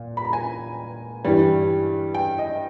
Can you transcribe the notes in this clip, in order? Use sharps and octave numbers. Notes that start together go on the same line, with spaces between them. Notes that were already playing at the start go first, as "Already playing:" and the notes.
Already playing: A#2
B5
A#5
G#5
G2 E3 G3
G5
D#5